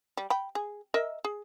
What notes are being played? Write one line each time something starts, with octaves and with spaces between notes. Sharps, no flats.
G3
G5 B5
G#4
A#4 D#5 E5
G#4